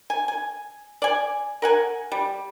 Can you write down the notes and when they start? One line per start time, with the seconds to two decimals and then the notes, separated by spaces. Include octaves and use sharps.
0.10 G#5
0.28 G#5
1.02 D5 G#5
1.62 A#4 F#5 G#5
2.12 G3